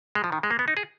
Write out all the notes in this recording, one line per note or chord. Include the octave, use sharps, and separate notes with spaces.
G#3
F3
D#3
G#3
A#3
B3
D#4
G#4